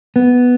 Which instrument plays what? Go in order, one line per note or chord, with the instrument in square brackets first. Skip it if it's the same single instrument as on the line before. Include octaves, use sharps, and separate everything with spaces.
[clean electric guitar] B3